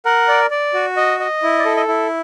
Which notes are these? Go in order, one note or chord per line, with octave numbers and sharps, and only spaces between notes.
A#4 F#5
D5
D5
F#4
D#5
D#5
E4
D5
A4
D#5
E4